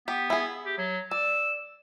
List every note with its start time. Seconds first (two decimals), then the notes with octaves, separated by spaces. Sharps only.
0.08 B3 G4
0.30 E4 G#4
0.65 G4
0.78 F#3
1.11 D5 E6